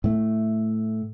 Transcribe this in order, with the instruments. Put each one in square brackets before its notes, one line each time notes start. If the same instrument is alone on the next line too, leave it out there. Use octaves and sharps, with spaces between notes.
[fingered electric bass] A2 A3